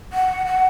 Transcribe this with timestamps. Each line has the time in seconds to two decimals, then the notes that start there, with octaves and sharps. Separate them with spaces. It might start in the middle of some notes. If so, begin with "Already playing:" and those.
0.13 F#5
0.46 F#5